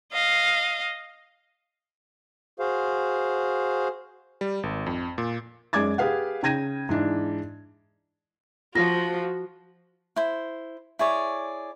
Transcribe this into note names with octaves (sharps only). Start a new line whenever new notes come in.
D#5 F5
F#4 G#4 C5 F5
G3
G#1
F2
A#2
F#2 G#3 D5 D6 G#6 A6
G4 G#4 B4 F5 F#5
C#3 G5 G#6 A#6 D#7
G#2 E3 D4
F3 F4 F#4 A#6
E4 C5
E4 G#4 C#5 D5